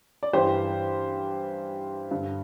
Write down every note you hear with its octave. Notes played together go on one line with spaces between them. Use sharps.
D5
G2 E3 G4 C5
G2 D3